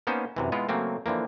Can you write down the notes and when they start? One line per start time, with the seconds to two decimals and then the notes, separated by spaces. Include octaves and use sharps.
0.07 A#3 B3 C#4 D#4 C5
0.36 F#2 C3 E3
0.52 G#3 B3 E4 F4
0.69 C#3 F#3 A3 A#3 C4
1.06 D3 E3 F3 A#3